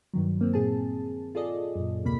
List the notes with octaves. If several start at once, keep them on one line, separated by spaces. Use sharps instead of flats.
G2 D#3 F#3
A#3 C4
A#2 G#4 A5
F4 G#4 A4 D5 D#5
F#2 A#2
A1 D#2 C3 A#3 B5 B6